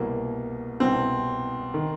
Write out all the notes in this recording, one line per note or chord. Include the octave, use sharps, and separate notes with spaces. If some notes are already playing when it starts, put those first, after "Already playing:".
Already playing: C2 B2 A#3
C2 B2 C4
D#3